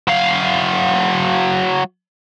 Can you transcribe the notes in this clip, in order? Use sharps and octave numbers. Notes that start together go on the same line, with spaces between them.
F#3 F5